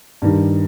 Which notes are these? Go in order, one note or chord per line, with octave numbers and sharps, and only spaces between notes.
G2 D#3 G3